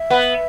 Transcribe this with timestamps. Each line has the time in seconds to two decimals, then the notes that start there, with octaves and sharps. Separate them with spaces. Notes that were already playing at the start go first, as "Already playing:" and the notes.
Already playing: E5
0.10 B3